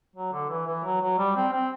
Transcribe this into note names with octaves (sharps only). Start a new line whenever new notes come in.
F#3
D3
E3
E3
F#3
F#3
G3
C4
C4